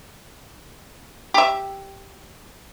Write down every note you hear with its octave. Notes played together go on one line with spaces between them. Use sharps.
G4 E5